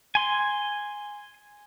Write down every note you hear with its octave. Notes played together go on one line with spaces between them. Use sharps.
G#5 C6